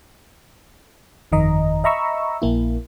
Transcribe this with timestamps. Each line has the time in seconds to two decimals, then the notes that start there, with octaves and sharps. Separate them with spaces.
1.32 G1 F2 D#3 D#5 A#5
1.84 D#5 E5 A#5 B5 C#6 E6
2.42 A#1 A#3 E4